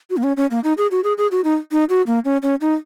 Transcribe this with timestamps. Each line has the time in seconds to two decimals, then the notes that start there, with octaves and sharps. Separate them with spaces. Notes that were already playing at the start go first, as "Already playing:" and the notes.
0.10 F#4
0.17 A#3
0.23 C#4
0.37 C#4
0.51 A#3
0.64 D#4
0.78 G#4
0.91 F#4
1.04 G#4
1.18 G#4
1.31 F#4
1.44 D#4
1.72 D#4
1.89 F#4
2.07 A#3
2.25 C#4
2.43 C#4
2.61 D#4